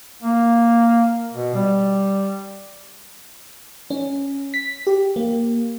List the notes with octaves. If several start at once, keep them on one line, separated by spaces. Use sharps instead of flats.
A#3
B2
G3
C#4
B6
G4
A#3